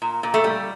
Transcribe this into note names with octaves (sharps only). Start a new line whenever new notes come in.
A#2
A#2
A3
G3